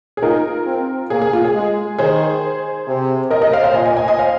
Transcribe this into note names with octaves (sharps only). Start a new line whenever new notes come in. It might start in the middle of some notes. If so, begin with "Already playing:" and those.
G#4
D#4 F4 A#4
C4
A#3 G#4
G#4
F4
G#4
G#3
D#3 G#4 C5
C3
A#4 D#5
A#4 D#5
C5 F5
C5 F5
A#2 D#5 G#5
D#5 G#5
D#5 G#5
D#5 G#5
C5 F5